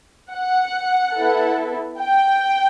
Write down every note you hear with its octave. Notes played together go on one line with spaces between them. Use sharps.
F#5
B3 E4 A4
G5